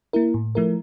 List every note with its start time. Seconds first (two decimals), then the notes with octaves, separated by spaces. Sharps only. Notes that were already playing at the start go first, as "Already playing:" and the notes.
0.13 A#3 E4 A#4
0.34 A2
0.55 F3 A3 E4 A#4